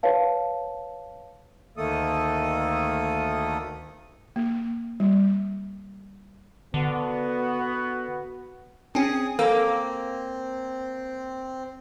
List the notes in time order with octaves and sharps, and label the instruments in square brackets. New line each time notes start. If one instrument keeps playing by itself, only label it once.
[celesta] B4 C#5 F5 A5
[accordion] D2 D#3 A3 A#3 A4 D#6
[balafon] A#3
G3
[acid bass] D3 [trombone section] B3 F#4
[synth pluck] C4 C#4 [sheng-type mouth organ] G#4 D#6
[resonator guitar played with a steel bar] A#3 [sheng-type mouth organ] C4 [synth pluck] A4